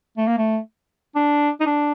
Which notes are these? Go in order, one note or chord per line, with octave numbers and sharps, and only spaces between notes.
A3
A#3
A3
D4
D#4
D4